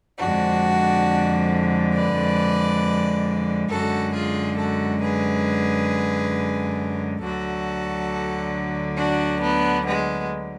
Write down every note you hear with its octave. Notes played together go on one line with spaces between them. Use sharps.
F2 D3 G#3 D4 F#4
B4 D5
F#2 D3 G#3 F#4 A4
F4 G#4
F#4 A4
G#4 B4
D2 D3 F#3 F#4 A4
D4 F#4
B3 D4
G#3 B3